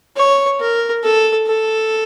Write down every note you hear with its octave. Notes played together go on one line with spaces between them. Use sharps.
C#5
A#4
A4
A4